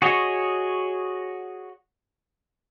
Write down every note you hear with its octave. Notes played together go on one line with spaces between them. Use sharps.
F#4 G#4 C#5 D#5